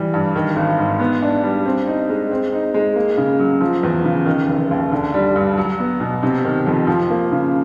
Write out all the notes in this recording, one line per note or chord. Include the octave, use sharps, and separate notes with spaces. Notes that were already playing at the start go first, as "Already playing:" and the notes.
Already playing: E3 G3
G2
D#3
G#1
G#2
B3
D4
G3
C4
D#4
G#3
C4
D#4
G#3
A#3
C#3
F#3
F3
E2
C#3
D#3
F1
D#2
D3
G3
G2
F#3
B3
B2
C3
D#3
F2
F3
A#3
C#3